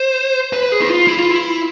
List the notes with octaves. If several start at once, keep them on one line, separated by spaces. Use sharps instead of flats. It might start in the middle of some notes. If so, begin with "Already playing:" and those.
Already playing: C5
B4
G#4
E4
F4
E4
F4
E4